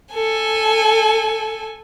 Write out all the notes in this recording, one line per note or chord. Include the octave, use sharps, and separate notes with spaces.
A4 G#5